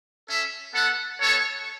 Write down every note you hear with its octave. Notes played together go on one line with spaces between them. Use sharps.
C#4 A4 E5
B3 A4 F#5
B3 A4 C#5